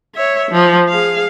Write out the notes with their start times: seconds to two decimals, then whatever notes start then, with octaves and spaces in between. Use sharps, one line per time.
0.15 C#5 E5
0.51 F3
0.89 G#4 F5